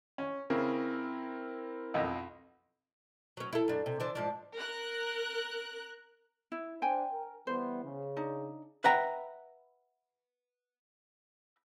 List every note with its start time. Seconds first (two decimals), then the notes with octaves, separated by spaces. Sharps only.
0.18 C#4
0.50 C#3 C4 E4 A#4
1.94 B1 F2
3.37 F#3 C#4
3.53 E4 A4
3.68 F#2 D4
3.86 C3
4.00 E3 D4 C5
4.15 G#2 F3 D4
4.56 A#4 F#6
6.52 E4
6.82 D4 C5 G5 G#5
7.12 A#4
7.47 E3 G3 B3 C5
7.84 C#3
8.16 D4 D#4
8.84 B4 E5 F#5 G5 A#5